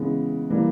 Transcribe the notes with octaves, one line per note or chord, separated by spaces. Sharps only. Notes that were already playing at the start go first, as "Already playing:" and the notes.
Already playing: C#3 E3 G#3 B3
E3 G3 A#3